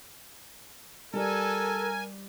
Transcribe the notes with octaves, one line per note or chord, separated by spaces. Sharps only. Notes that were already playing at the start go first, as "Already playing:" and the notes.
G3 G4 A4 A#4 D5 G#5